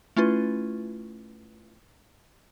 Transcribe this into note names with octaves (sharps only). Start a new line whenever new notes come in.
A3 C#4 E4 F4 B4